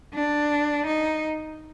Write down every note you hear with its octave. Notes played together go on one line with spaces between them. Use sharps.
D4
D#4